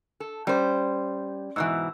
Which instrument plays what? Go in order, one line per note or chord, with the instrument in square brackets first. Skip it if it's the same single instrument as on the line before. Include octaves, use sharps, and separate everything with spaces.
[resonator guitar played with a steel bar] A4
[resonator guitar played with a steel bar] G3 C5 [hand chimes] C#4 D5
[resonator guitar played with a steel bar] G#2 B2 E3 [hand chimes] E6